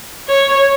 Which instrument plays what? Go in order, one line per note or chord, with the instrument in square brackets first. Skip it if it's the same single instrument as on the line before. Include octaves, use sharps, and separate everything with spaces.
[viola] C#5